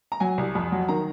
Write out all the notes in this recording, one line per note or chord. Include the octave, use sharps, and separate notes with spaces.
A#5
F#3 G#5
C2
F2
F#3
D#3 A#5